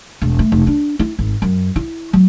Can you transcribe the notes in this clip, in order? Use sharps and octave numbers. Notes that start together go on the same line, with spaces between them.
E1
A3
F1
D4
E4
G#1
F#2
E4
F#3